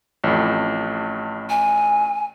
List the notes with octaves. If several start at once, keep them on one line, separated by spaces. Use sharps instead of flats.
A1 F2
G#5